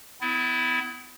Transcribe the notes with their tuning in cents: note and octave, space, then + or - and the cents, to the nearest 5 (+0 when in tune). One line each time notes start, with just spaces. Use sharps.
B3 +40 E4 +0